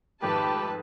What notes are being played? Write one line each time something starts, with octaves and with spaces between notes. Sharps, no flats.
F2 G#2 D#3 A3 G4 B4 A5